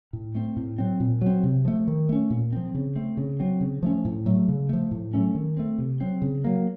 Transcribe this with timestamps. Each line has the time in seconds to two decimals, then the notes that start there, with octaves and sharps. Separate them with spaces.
0.13 A2
0.35 A3 C4
0.56 A2
0.78 F#3 C4
1.00 A#2
1.21 F#3 C4
1.44 C3
1.65 F3 A3
1.88 D#3
2.09 A3 C#4
2.30 A#2
2.53 F3 C4
2.75 C#3
2.96 A3 C4
3.17 C#3
3.40 F#3 C4
3.61 C#3
3.83 F3 A3 C#4
4.05 A2
4.26 F#3 A3
4.48 C#3
4.69 F3 A3
4.91 A2
5.14 F#3 A3 C#4
5.35 D#3
5.57 A3 C4
5.78 C3
6.01 F#3 C4
6.22 C#3
6.44 F#3 A#3